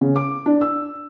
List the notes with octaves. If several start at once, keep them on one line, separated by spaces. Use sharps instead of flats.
C#3
D6
D4
E6